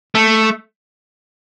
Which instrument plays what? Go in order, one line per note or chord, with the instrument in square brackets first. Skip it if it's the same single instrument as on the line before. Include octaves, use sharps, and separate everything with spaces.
[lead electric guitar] A3